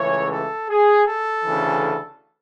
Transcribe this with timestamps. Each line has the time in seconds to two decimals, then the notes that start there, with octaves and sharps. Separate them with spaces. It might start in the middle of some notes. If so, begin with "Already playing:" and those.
Already playing: C#2 C#3 E3 A3 C#5
0.31 A4
0.70 G#4
1.06 A4
1.45 D2 C#3 E3